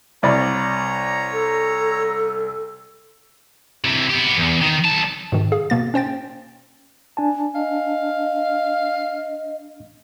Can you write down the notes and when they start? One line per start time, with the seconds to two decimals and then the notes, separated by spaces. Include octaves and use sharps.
0.23 C2 C#5 D5 A#5 B5
1.32 A4
3.84 C3 E3
4.10 B3 G4
4.37 E2
4.62 D#3
4.85 B1 A5
5.32 G#2 B2 D#3
5.52 G#4 F5
5.70 B2 A#3 A6
5.94 C#4 C5 G5 A6
7.17 D4 G#5 A5
7.55 D#5 F5